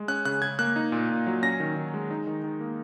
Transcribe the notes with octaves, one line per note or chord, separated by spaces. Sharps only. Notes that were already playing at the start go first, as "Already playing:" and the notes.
Already playing: G#3
C#4 F#6
C#3 F#6
C#3 G#6
A#3 F#6
D#4
A#2
A#2
F#3
C#4 A#6
D#3
D#3
G#3
D#4
D#3
D#3
A#3